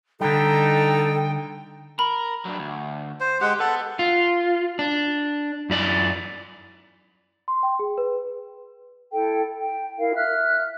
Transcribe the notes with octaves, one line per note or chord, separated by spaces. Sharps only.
D3 G3 D#4 A4 G5
A#4 B5
F#3 D4
D2
C5
G#3 G4 F#5
A4 B4 F#5
F4
D4
F#2 E4 D5
C6
G5
G#4
B4
E4 A4 G5
G5
E4 A#4 F5
E5 F6 F#6